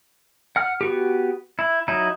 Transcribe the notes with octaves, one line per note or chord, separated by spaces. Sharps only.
F#5 F6
B3 F#4 G4
E4
F#3 D#4 E4